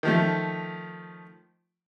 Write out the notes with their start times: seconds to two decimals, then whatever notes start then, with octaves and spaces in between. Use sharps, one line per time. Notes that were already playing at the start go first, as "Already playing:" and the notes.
0.03 D#3 F3 A3